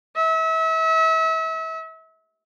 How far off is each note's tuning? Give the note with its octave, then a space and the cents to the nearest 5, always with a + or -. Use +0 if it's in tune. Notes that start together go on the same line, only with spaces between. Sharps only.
E5 -35